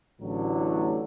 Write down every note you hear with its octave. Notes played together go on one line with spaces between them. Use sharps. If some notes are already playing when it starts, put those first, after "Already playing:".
A1 A2 D3 F#3